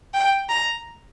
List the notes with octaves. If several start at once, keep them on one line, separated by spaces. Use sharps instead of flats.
G5
A#5